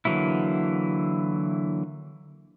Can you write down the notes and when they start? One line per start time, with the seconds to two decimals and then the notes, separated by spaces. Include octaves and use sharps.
0.05 D3 E3 F#3 A#3 E4